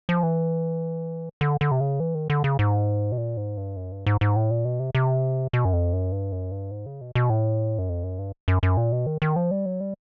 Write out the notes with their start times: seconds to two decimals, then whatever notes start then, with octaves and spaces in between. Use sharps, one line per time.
0.09 F3
0.23 E3
1.41 D3
1.61 D3
1.71 C3
1.80 C#3
2.00 E3
2.15 D#3
2.30 D3
2.44 C#3
2.59 G#2
3.12 B2
3.18 A#2
3.37 G#2
3.57 G2
3.77 F#2
3.92 G2
4.06 G#2
4.21 G#2
4.36 A2
4.51 A#2
4.65 B2
4.80 C3
4.95 C3
5.53 B2
5.65 F#2
5.73 F2
5.93 F#2
6.12 G2
6.32 F#2
6.52 G2
6.71 G#2
6.86 C#3
7.01 B2
7.15 B2
7.30 A2
7.78 F#2
7.89 F2
8.04 F#2
8.19 G2
8.48 F#2
8.63 F#2
8.77 A#2
8.92 B2
9.06 D#3
9.22 D#3
9.36 F3
9.51 G3
9.66 F#3
9.81 G3